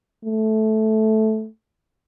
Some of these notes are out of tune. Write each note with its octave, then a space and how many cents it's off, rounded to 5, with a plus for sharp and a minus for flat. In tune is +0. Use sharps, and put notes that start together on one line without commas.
A3 -10